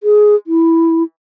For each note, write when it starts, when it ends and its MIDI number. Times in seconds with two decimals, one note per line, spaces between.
0.03 0.35 68
0.47 1.03 64